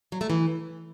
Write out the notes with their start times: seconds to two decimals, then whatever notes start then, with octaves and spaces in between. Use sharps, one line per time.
0.12 F#3
0.21 A3
0.30 E3